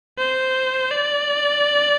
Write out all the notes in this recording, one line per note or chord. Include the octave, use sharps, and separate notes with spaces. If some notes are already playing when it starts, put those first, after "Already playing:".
C5
D5